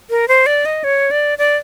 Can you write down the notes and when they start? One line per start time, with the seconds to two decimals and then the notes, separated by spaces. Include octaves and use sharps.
0.10 A#4
0.28 C5
0.46 D5
0.65 D#5
0.84 C#5
1.11 D5
1.38 D5